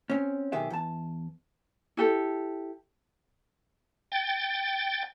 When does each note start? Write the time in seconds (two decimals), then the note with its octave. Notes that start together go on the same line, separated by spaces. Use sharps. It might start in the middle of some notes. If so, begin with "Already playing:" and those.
0.10 C4 C#4
0.52 B1 D#3 G4 G#4 E5
0.70 E2 A5
1.97 E4 G4 A4
4.12 G5 A6